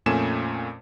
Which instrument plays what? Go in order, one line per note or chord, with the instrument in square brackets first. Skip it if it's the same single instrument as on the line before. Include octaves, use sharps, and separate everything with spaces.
[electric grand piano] F2 A#2 A3 C#4 G#5 E7